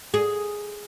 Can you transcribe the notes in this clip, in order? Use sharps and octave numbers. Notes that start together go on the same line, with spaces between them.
G#4